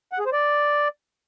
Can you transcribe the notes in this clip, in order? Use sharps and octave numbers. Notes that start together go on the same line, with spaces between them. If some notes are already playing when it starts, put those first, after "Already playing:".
F#5
G#4
C5
D5